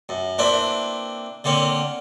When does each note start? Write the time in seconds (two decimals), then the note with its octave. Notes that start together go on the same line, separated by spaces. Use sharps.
0.09 F#2
0.38 A#3 C4 D4 E4 B4
1.44 D3 A#3 C4 C#4